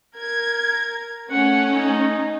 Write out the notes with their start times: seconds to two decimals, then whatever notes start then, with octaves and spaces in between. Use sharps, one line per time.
0.17 A#4 G#6
1.31 A3 C#4 F#5
1.72 D#4